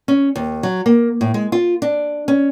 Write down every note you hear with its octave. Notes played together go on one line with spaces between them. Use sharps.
C#4
D#2
F#3
A#3
A2
G#3
F4
D4
C#4